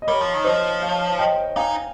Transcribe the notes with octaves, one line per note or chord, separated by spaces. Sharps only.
D#5
G3 A#4 C#5
F3
D#3
F3 C5 D#5
C#5 F5
D#5 G5
D#4 F5 G#5